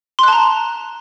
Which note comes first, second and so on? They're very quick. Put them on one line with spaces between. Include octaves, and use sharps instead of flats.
C6 F#6 A5 A#5